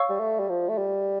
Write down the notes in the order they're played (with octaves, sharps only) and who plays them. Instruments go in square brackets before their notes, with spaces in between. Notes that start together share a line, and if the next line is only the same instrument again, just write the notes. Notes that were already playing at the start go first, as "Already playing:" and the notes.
Already playing: [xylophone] C#5 F5 C#6 E6
[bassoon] G3
A3
G3
F3
A3
G3